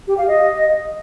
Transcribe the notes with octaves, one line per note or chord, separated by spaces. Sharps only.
G4
F5
D#5